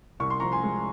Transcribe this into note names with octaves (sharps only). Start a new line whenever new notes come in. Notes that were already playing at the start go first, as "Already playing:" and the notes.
C2 C#6
C6
F3 A#5 C#6
G#5 C6
G#3